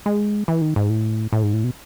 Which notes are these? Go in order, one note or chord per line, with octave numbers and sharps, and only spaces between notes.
G#3
E3
D#3
G#2
A2
A2
G#2
A2
B2